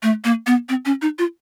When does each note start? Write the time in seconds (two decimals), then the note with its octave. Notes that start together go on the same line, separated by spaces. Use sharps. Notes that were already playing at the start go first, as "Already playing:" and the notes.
0.03 A3
0.25 A#3
0.47 B3
0.69 C4
0.86 C#4
1.02 D#4
1.19 F4